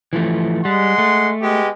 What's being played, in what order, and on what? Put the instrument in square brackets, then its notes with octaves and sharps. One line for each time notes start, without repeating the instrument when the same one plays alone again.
[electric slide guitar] E3 F3 A3
[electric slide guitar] G3 [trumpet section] G#3 F#5 C6
[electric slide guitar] A3
[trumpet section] G#3 B3 G4